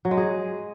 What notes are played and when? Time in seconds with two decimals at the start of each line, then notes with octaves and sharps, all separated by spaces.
0.05 F#3
0.11 G#3
0.17 G#4